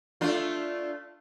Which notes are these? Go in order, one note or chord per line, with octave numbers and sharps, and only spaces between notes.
A3 D4 F4